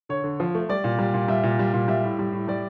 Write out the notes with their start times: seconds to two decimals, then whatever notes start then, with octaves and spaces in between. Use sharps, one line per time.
0.09 D3 C#5
0.24 D3
0.40 F3
0.55 A3
0.69 G3 D5
0.84 A#2
0.99 G3
1.14 A#2
1.28 G3 E5
1.43 A#2
1.59 G3
1.74 A#2
1.88 G3 E5
2.04 A2
2.19 G3
2.33 A2
2.48 G3 D5